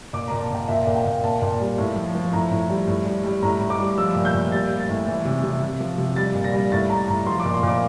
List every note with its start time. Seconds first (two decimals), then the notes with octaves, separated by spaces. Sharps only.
0.13 A#2 D6
0.28 A#5
0.31 A#2
0.41 A5
0.50 A#2 G5
0.68 A#2 E5
0.87 A#2
0.96 G5
1.05 A#2
1.23 A#2 A5
1.42 A#2
1.60 G3
1.78 A2
1.96 F3
2.15 F3
2.33 A2 A#5
2.51 A2
2.70 G3
2.87 A2
3.06 G3
3.24 G3
3.42 A2 A#5
3.61 A2
3.70 D6
3.79 G3
3.98 F3 E6
4.16 A#2
4.25 G6
4.34 A#2
4.52 G3 A6
4.71 G3
4.80 A6
4.89 A2
5.07 E3
5.25 C3
5.44 C3
5.62 C3
5.80 F3
5.98 C3
6.16 G3 A6
6.35 A#2
6.44 A#6
6.53 G3
6.72 A2 A6
6.90 A2 A#5
7.08 A2 A#5
7.26 F3 C6
7.40 D6
7.45 A#2
7.54 C6
7.63 A#2 D6